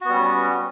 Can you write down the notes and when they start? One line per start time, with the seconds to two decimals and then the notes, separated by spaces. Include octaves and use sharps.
0.01 F#4
0.05 B3
0.09 G3
0.13 C#4